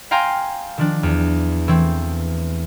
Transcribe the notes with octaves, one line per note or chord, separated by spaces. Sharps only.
F5 G5 G#5 A#5 C6
D#3 F3 D4
E2
E3 A3 C4